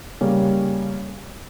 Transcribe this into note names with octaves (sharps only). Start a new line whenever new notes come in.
C#3 G3 A#3 C#4